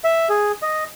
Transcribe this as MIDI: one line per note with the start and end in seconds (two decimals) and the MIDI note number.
0.04 0.29 76
0.29 0.52 68
0.62 0.84 75